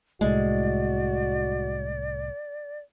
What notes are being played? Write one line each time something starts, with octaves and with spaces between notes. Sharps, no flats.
C2 A2 G#3 F#4 D5